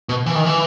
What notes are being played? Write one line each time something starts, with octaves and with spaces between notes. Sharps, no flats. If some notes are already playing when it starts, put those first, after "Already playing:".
B2
E3
D#3
E3